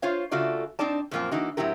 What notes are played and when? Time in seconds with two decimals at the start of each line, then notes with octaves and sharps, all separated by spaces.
0.02 F4 C5 C#5 F5
0.31 C#3 A3 F4 F#4 D5
0.79 C4 D4 D#4 D5 A5
1.11 F#2 A#2 F3 A#3 C4
1.31 E3 A#3 D#4 F#4
1.57 A2 F#3 C4 E4 G4 A#4